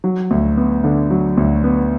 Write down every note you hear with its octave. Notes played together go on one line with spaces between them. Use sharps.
F#3
D2
B3
D3
F#3
D2
B3